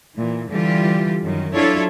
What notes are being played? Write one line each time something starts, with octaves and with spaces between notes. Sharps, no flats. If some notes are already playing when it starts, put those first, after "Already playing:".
A#2 E3
D3 E3 G3 F4 G4
F#2 D#3
F#3 D4 E4 F4 A4 C#5